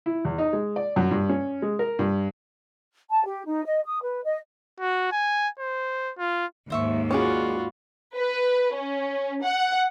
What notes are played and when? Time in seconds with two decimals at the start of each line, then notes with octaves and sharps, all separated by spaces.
0.06 E4
0.25 E2
0.38 D#4
0.53 G#3
0.76 D5
0.96 F#2
1.11 G2
1.29 C#4
1.62 G#3
1.79 A#4
1.99 G2
3.10 A5
3.25 G4
3.45 D#4
3.65 D#5
3.86 D#6
4.02 B4
4.25 D#5
4.80 F#4
5.12 G#5
5.59 C5
6.18 F4
6.70 D#2 G#2 C5 E5 C#6
7.11 C#4 F4 F#4 G#4 B4 D5 C#6
8.17 B4
8.75 C#4
9.44 F#5